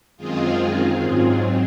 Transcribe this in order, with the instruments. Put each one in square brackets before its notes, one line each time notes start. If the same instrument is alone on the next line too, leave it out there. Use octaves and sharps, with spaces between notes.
[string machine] F#2 D#3 G#3 C4 F4 G#4
G#2 F#3 C4